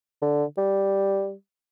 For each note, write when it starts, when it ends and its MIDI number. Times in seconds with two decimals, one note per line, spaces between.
0.22 0.44 50
0.57 1.33 55